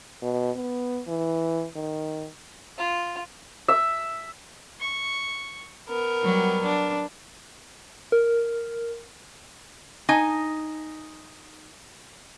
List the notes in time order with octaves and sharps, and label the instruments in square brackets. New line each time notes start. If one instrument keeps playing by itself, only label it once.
[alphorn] B2
B3
E3
D#3
[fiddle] F4
[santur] E5
[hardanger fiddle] C#6
B3 A#4
[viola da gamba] F#3 G3
D4
[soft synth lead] A#4
[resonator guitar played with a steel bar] D#4 G#5